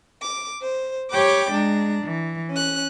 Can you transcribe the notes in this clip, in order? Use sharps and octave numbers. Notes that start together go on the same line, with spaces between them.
D6
C5
G4 C#5 G5 B5 D6
G#3 D4 A#5
E3
C#4 F#6